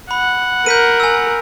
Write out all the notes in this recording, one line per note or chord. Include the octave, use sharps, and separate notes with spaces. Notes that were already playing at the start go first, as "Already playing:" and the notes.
F#5 B5
A#4 G6 B6 D#7
G#5 E6